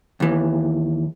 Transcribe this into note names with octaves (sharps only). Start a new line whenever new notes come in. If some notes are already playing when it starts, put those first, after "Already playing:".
D#2 E3